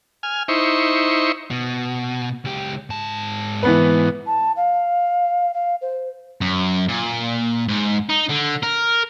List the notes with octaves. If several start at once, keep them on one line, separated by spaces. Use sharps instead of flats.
G#5 F6
D#4 E4 C5 C#6
B2
C#2 G4
G#2 A5
E3 B3 B4
A5
F5
F5
C5
F#2
A#2
G#2
D#4
D3
A#4